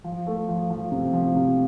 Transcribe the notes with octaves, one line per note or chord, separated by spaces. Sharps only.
F3
A3
F3
F3
C3
F3
C3